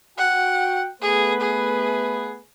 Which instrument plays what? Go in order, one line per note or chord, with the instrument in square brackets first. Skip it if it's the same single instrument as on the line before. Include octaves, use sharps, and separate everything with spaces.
[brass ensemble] F#4 G5 [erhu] F#5
[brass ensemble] A3 B3 B4 [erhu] G#4
[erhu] G#4